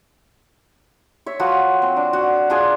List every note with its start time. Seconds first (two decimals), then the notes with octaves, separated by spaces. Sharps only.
1.26 C#5 E5
1.39 F3 F#4 B4
1.82 C4
1.97 D4
2.13 F#4
2.50 D4 F4 G#4 G#5